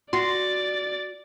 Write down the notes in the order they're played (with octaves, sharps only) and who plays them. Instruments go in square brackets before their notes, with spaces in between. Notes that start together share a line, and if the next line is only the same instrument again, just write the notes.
[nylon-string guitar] F#4 [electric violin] D5 A6 [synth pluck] C6